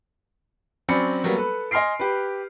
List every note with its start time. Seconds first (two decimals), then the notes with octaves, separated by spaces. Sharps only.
0.89 F#3 C4 C#4 D5 B5 C#7
1.24 F#3 G3 A#3 B3
1.36 A4 B4
1.71 D#5 G#5 C6 F6 C7 D7
2.00 G4 B4